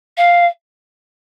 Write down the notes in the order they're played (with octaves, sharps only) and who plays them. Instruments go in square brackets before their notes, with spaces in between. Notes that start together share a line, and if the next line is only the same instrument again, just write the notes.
[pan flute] F5